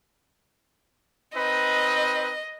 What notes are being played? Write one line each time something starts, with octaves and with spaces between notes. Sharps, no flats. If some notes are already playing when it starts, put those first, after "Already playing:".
C4 D#4 B4 D#5